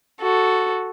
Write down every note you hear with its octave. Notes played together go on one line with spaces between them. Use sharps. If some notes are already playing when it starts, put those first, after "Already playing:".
F#4 A4